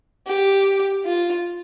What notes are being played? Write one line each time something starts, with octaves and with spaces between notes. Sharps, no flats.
G4
F4